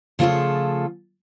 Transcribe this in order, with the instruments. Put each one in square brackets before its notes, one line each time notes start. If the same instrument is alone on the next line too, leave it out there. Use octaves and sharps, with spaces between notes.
[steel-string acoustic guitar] C#3 F3 A3 F4 G#4 A4